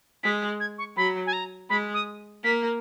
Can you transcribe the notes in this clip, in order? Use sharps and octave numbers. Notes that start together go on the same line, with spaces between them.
G#3 B6
G#6
C#6
F#3 B5
G#5
A#5
G#3 B5
D#6
A#3 B6